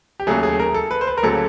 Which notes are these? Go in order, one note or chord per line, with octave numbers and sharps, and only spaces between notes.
G4
D#2 C#3 F#3 A3 G#4
G#4
A#4
A4
B4
C5
B4
A#4
D2 C#3 F#3 A#3 A4